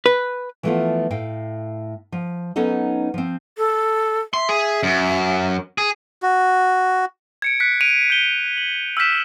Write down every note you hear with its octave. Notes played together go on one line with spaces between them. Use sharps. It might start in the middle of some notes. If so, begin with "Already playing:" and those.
B4
E3 F3 A3 B3 E4 F4
A2 F5 G5
F3
F#3 B3 C#4 D#4 A4 D#5
F3 C4
A4
E5 C6
G#4
F#2
G#4
F#4
G#6 C#7 D7
F#6 B6 C#7
D7 D#7 F7
G6 G7
F#7
E6 F6 G6 B6 E7